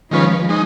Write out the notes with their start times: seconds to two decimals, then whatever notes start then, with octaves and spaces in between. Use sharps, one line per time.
0.11 D#3 F3 G#3 C#4 F4 B4
0.49 G#3 D#4